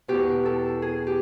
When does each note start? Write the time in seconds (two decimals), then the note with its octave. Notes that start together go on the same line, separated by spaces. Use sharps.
0.08 E2 B2 G4
0.45 A4
0.82 G#4
1.07 G4